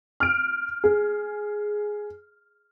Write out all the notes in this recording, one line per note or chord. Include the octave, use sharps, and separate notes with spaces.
F6 D7
G#4